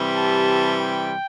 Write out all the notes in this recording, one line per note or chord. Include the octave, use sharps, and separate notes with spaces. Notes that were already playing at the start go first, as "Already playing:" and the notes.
Already playing: C3 E3 G3
A5
G5